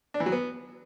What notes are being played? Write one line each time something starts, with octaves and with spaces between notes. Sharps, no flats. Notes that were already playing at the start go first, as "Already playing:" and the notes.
D4
E3
F#3
B3